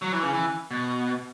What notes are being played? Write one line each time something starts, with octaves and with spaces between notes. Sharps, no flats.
F#3
E3
C#3
E3
B2